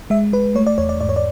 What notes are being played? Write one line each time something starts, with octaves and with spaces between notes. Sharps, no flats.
G#3 E5
G#3 B4
A3 C#5
D5
E2 C#5
D5
G#2 D5
C#5
D5